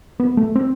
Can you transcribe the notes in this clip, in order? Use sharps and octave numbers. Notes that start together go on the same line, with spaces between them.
B3
A3
C4